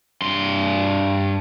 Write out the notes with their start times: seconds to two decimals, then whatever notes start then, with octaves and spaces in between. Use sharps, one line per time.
0.22 G2 C6